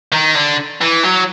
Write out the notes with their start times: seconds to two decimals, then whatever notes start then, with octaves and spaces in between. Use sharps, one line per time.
0.12 D#3
0.35 D3
0.82 E3
1.04 F#3